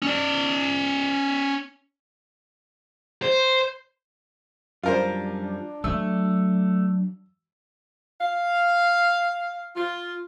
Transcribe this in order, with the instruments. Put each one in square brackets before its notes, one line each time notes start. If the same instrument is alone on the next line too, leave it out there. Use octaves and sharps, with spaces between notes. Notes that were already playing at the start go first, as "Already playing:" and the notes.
[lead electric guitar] C#4 D5
C5
[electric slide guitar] F#2 F3 G3 [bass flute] D4 [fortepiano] F4 A#4 C5
[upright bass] F#3 [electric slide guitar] A3 [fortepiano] E6
[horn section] F5
F4